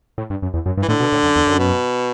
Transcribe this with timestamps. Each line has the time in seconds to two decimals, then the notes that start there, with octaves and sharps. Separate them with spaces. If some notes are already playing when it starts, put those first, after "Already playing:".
0.18 A2
0.30 G2
0.42 F#2
0.54 E2
0.66 F#2
0.77 G2
0.82 E3
0.88 A2 D3
1.00 B2
1.13 A2
1.23 F#2
1.36 E2
1.47 F#2
1.59 B2